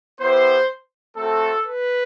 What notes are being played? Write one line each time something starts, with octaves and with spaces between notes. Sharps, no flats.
B3 E4 G4 C5
A3 C4 F#4 A4
B4